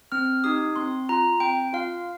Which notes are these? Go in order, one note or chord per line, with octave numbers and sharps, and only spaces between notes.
C4 F6
D#4 G4 D#6
C4 C6
F4 A#5
C4 G5
F4 F5